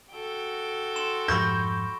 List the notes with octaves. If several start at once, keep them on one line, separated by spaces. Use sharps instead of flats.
F#4 A4 G5
C6 E7
F2 G#2 F3 B5 C#6 G6 A#6